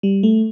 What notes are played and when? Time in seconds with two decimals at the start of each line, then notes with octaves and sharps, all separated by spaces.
0.03 G3
0.23 A3